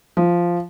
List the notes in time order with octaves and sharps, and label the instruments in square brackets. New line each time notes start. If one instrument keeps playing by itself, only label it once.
[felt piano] F3